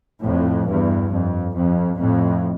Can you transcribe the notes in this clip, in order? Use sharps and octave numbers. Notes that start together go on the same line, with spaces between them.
F2 A2
E2 G2
F2
F2
F2 A2